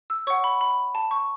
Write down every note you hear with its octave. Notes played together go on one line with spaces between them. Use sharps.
E6
C#5 F#5 C#6
B5
B5
A5
C#6